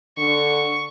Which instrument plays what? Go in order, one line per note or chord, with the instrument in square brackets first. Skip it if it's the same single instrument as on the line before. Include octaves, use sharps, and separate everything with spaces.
[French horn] D3 [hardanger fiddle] C#6